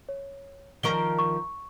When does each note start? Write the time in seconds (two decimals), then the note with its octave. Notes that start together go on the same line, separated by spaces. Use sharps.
0.09 C#5
0.83 D#3 F3 A#4 C#6 D7 G7
1.19 C#6